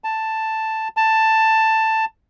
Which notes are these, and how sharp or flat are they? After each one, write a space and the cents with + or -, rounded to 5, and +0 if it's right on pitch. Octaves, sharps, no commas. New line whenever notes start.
A5 +5
A5 +10